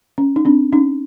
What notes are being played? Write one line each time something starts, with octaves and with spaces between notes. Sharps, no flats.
C#4
D#4
C4 D4
C#4 D#4